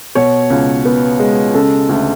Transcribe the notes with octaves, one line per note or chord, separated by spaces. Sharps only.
B2 C#5
C#2
B3
G#3
C#3 A4
D2